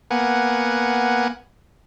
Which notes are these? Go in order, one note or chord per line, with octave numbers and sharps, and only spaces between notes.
A#3 B3 F#5 G#5